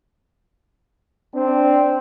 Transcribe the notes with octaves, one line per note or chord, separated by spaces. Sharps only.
C4 D4